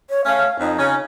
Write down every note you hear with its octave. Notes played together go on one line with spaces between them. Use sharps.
C#5
A3 C#4 F5
F2 D#4
C#3 C#4